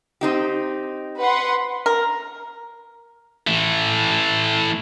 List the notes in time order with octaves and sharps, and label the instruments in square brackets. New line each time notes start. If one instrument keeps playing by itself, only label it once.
[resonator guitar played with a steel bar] C4 D#4 G4
[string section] B4 F#5 C6
[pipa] A#4
[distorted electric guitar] E3 A3